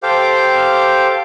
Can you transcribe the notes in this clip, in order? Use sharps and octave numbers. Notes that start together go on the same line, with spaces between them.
G4 A4 C5 F5 G5 D6